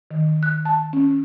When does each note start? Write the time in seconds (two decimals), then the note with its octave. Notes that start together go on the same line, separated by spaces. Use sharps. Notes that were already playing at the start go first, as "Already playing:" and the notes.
0.11 D#3
0.43 F#6
0.65 A5
0.93 C#4